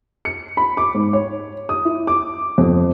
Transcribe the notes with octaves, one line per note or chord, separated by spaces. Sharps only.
C#7
B5
D6
G#2
C#5
D#6
E4
D6
F2